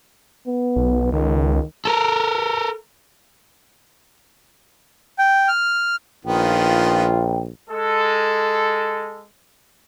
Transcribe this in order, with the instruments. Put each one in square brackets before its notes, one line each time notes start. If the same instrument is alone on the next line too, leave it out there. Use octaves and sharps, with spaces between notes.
[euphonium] B3
[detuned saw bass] B1
[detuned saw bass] C#2 [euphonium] D#3
[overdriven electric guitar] A4 A#4
[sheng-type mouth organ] G5
F6
[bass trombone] A#1 [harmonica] D#3 F3 B3 [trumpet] F4 [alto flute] G5
[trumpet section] G#3 A4